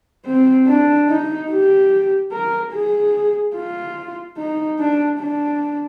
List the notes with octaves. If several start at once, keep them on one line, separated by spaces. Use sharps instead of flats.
C4
D4
D#4
G4
A#4
G#4
F4
D#4
D4
D4